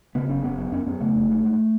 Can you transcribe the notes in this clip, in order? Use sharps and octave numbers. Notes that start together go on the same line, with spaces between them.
C#3 B3
F#1 C#4
F#1 B3
F#2
F#2 C#4
F#2 B3
C#3 A3
F#1
G#2
G#2